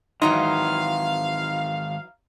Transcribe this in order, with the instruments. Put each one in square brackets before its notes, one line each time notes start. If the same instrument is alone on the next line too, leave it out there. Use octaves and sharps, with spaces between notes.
[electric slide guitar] G#2 D#3 [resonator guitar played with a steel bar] E3 F#3 D#4 [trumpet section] F5 [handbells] C6